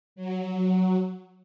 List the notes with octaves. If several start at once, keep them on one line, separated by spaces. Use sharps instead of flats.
F#3